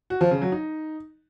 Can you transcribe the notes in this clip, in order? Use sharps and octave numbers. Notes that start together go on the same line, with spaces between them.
F#4
F3
C#3
F#3
D#4